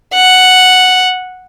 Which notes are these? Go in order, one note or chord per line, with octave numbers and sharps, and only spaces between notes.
F#5